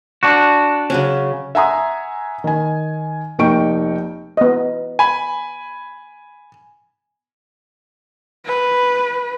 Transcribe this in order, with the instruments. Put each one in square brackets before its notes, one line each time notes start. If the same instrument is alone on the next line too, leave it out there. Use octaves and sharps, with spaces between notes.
[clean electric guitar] D4 F#4
[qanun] C#3 F#3 C#4
[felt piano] E5 F#5 G#5 A#5 C6 D#6
D#3 G#5
F1 A#3 D#4 G5 C#6 D7
[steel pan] B3 D#5
[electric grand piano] G#5 B5
[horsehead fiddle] B4